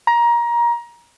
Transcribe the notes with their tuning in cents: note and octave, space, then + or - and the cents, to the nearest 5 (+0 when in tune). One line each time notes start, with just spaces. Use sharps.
A#5 +20